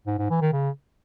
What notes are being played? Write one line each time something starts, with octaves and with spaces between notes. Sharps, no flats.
G#2
G#2
E3
D#3
C#3